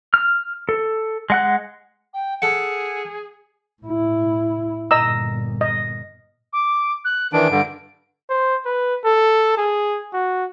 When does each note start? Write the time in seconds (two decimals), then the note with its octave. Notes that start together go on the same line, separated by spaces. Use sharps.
0.14 F6
0.69 A4
1.30 G#3 F#5 F#6
2.14 G5
2.42 G#4 A4 F#5
3.83 A2 E4
4.91 G1 A#2 D#5 A#5 E6
5.61 D#5
6.53 D6
7.05 F#6
7.33 D#3 E3 D4 D7
7.50 G2 D3
8.30 C5
8.65 B4
9.05 A4
9.57 G#4
10.13 F#4